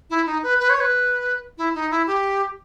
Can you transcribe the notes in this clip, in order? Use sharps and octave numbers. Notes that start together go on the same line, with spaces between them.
E4
D#4
B4
B4
C#5
B4
E4
D#4
E4
G4